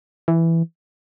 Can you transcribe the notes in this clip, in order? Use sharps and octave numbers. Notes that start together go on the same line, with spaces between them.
E3